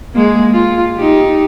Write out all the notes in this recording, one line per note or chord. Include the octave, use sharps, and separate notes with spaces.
G#3 A#3
F4
D#4 G4